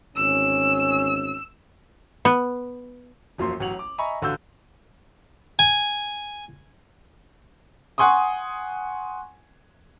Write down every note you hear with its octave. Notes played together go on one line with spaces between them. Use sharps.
G#1 D2 C#4 E6
B3
E1 F#2 F3 A#3 C6
A1 F#3 F#5 F7 F#7
D6
D#5 E5 G#5 A#5 B5 C#6
A1 D3 F#4 F5 E6 G6
G#5
F#5 G#5 C6 C#6 D#6